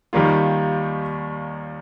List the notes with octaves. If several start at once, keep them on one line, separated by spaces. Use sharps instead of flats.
D#2 D#3 G3 A#3 F4